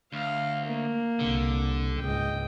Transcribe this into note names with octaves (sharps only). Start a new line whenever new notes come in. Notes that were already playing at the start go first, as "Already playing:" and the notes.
D2 F5
A#3
C2 D3
C#2 G#2 D#5 G5